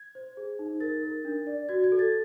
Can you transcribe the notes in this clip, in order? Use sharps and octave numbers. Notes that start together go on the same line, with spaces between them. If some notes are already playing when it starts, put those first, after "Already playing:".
Already playing: G#6
C5
G#4
D#4
A#4 A6
A#4
D4
D5
F#4 G#6
G#6
A4
A6